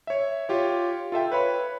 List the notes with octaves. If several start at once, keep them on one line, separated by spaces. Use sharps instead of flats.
C#5 E5
F4 G4 C#5
F4 A4 E5 G5
B4 C#5 B5